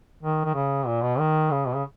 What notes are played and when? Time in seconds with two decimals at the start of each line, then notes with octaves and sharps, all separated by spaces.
0.23 D#3
0.45 D#3
0.55 C#3
0.87 A#2
1.02 B2
1.19 D#3
1.51 C#3
1.67 B2
1.75 C#3